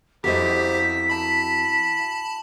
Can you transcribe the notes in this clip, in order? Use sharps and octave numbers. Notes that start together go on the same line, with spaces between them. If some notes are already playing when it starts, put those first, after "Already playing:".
F2 E4 F#4 G4 A#4 C5 D#5 B6
A5 B5